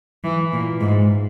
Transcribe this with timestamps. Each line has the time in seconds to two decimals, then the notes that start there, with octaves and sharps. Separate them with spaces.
0.24 E3
0.52 A#2
0.81 G#2